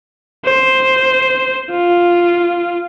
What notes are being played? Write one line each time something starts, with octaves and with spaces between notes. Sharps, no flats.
C5
F4